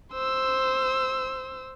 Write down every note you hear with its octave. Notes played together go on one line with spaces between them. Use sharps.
C5 E6